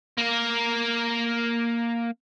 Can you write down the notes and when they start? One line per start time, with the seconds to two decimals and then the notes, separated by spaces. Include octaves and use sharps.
0.18 A#3 A#4